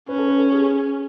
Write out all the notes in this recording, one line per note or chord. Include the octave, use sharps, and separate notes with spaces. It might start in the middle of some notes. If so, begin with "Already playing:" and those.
C#4 B4
A4
B4
A4
G#4